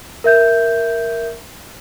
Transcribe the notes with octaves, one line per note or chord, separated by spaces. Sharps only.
A#4 E5 G6